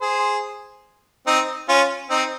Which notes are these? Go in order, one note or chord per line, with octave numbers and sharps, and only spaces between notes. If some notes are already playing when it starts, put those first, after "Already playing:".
G#4 C5
C4 D#4
C#4 F4
C4 D#4